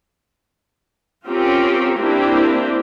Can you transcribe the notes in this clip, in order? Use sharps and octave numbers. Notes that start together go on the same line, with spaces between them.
C4 C#4 F4 G4 A#4
A#3 C4 D4 E4 G4